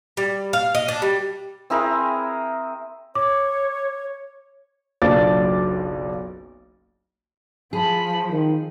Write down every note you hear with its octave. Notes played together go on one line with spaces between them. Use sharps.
G3
F5
D#5
D4
G3
C4 E4 G#4 A#4
C#5 D6
F#1 B1 D4 F4 D6 A6
F3 G#4 A5 B5
D#3 C4